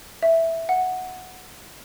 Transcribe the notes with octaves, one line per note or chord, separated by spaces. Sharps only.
E5
F#5